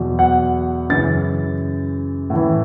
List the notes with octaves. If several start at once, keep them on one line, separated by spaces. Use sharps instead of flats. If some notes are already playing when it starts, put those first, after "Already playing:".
Already playing: E2 B2 F#3
F#5
F#2 C#3 E3 A6
A2
E3